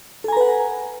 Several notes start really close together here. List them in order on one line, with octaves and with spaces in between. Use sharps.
A4 G#5 A#5 B4 F#5